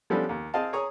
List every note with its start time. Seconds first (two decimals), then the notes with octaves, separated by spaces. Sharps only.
0.10 F3 G3 B3 C#4 D4 A4
0.29 D#2
0.54 C4 G#4 D#5 F5 A5
0.73 G#4 C#5 A#5 C#6 D#6